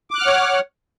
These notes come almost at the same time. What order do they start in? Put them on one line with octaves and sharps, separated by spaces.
D6 F#6 F6 F#5 C#5